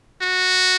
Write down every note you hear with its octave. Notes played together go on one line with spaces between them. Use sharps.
F#4